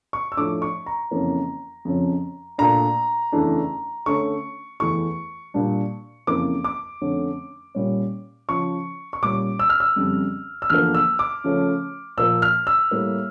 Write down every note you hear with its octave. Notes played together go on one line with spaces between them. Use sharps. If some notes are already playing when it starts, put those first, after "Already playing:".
C#6
E6
A2 F3 A3 D4 D6
C#6
A#5
F2 C#3 E3 A#3 C#4
F2 C#3 F3 C#4
A#2 A3 D4 A#5
E2 C#3 E3 A3 D4
D3 A3 C#4 C#6
E2 E3 A3 C#6
A#2 G3 D4
F2 C#3 E3 A#3 D6
D6
F2 D3 A3 C#4
A#2 G3 C#4
C#3 F3 C#4 C#6
C#6
A#2 G3 C#4 D6
E6
F6
E6
F2 C#3 G3
E6
E2 D3 F3 A#3 F6
E6
D6
C#3 F3 A3 C#4
A#2 F3 A#3 E6
F6
E6
A2 G3 A#3